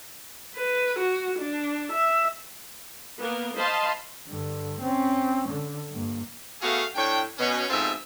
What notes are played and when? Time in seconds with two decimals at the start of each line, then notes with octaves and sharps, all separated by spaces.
0.56 B4
0.99 F#4
1.39 D4
1.92 E5
3.19 A#3 B3 A#4
3.57 C5 D#5 F5 A5 B5 C6
4.28 G2 D3
4.81 C4 C#4
5.49 D3
5.91 G2 A#3
6.62 A3 B3 F#4 G#4 F5
6.95 A2 D4 C#5 G5
7.38 B2 C#4
7.69 G#2 B2 C4 F4 A4 E5